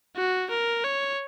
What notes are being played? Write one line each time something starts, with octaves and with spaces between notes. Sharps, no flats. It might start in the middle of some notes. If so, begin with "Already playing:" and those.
F#4
A#4
C#5